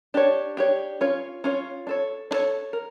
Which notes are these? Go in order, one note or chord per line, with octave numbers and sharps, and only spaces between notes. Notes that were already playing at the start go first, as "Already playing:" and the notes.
D4 G4 C#5
D4 G4 C#5
C#4 F4 C#5
C#4 F4 C#5
D4 A4 C#5
D4 A4 C#5
A#4